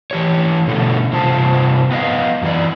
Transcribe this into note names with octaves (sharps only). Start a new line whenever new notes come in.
E3 G4 C#5
B2 D3 A3
G2 C3 F4 C5 A5
B3 B4 D#5 F5
F#2 E3 D5